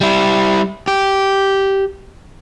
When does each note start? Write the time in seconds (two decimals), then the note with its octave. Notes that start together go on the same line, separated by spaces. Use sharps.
0.01 G3 E4
0.88 G4